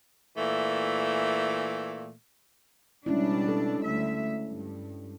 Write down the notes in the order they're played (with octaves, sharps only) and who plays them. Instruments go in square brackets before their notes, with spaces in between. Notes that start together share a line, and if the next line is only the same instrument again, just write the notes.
[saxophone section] A#2 E3 A3
[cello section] B2 G3 D4 [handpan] G#3 C#4 E4
[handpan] A4
[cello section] D2 E5
G2